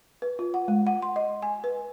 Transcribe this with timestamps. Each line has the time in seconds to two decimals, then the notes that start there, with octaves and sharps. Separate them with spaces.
0.22 B4
0.39 F4
0.54 F#5
0.68 G#3
0.87 F#5
1.02 C6
1.16 D#5
1.42 G#5
1.64 B4